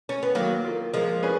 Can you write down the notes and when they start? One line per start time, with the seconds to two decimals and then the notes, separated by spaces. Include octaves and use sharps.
0.09 C#4
0.23 B3
0.35 D#3 F#3 A#3
0.64 A#3 F4
0.94 F3 G#3 A#3
1.23 C#4 G#4 B4